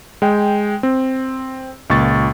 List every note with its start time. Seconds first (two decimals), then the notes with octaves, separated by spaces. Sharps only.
0.22 G#3 G5
0.83 C4
1.90 C#2 A#2 C#6 A6